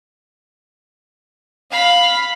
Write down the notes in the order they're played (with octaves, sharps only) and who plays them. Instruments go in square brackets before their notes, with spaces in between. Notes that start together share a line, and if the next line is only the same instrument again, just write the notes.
[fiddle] F5 B5